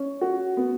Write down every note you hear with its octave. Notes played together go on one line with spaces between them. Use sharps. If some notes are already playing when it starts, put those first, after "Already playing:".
Already playing: C#4
F#4
B3